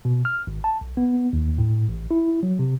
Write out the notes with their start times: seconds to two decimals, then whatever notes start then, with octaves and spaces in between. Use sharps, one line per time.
0.05 B2
0.25 F6
0.47 G#1
0.64 A5
0.81 B1
0.97 B3
1.33 D#2
1.58 A2
1.89 A1
2.11 E4
2.43 F#3
2.59 C3